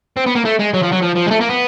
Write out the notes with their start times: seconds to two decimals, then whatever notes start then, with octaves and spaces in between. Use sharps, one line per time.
0.17 C4
0.26 B3
0.35 A#3
0.45 A3
0.60 G#3
0.74 F#3
0.83 F3
0.92 F#3
1.02 F3
1.16 F3
1.27 G#3
1.31 A3
1.41 A#3
1.49 B3